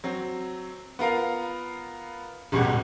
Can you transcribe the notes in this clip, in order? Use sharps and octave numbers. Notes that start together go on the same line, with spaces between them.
F#3 C4
B3 F4 A#4 F5
D#1 A1 B2 G3 G#3 F#5